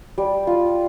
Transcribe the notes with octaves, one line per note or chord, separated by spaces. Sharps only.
G3
F4